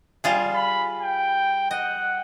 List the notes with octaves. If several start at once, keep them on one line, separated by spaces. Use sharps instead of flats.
G3 F4 G#4
B5
G5
D#5 F#5